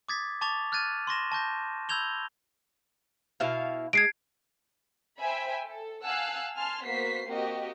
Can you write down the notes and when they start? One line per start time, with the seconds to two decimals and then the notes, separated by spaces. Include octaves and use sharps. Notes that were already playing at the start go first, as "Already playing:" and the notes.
0.09 D6 D#6 G#6 A6 B6
0.41 A5 C#6 D6 A6 F7
0.72 F6 F#6 G#6 A6 D#7
1.07 C6 C#6 A#6 E7
1.32 A5 C#6 G6 A#6
1.89 B5 E6 G6 G#6 F7 G7
3.40 B2 E4 F5
3.93 G#3 G#6 C7 D7
5.20 C5 E5 G5 G#5 B5
5.64 A4
6.03 F5 F#5 G#5 A5 E6 F#6
6.56 G#5 A5 C6 F6
6.85 A#3 B3 F#4 C5 B6 C7
7.27 A#3 C4 F#4 G4 D#5